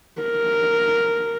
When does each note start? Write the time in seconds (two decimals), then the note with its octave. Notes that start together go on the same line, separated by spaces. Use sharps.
0.21 A#4